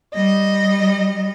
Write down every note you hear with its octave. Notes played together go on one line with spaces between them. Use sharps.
G3 D#5